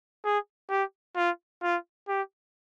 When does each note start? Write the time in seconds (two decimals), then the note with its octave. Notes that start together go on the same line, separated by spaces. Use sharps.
0.25 G#4
0.70 G4
1.16 F4
1.63 F4
2.08 G4